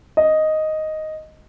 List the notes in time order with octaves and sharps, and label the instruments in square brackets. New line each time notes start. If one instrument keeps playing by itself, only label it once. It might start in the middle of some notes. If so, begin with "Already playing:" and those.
[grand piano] D#5